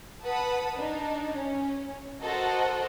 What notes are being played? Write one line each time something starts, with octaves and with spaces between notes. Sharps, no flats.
B4 F#5 A5 B5 D#6
D4 D#4
C#4
F#4 A4 A#4 C5 D#5 F#5